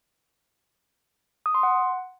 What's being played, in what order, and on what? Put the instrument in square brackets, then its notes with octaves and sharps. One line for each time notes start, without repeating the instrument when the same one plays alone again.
[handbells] D#6
C6
F#5